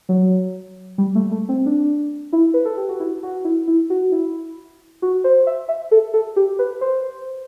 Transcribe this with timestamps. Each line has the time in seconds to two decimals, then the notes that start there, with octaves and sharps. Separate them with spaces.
0.09 F#3
0.98 G3
1.15 A3
1.32 A3
1.49 C4
1.66 D4
2.33 E4
2.54 B4
2.65 A4
2.77 G4
2.89 F#4
3.00 E4
3.23 F#4
3.45 E4
3.68 E4
3.90 F#4
4.12 E4
5.02 F#4
5.24 C5
5.47 E5
5.69 E5
5.91 A4
6.14 A4
6.36 G4
6.59 B4
6.81 C5